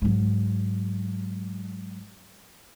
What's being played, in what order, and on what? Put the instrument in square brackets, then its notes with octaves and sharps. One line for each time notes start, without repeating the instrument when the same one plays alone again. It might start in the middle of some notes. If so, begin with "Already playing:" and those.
[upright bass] G#2 F#3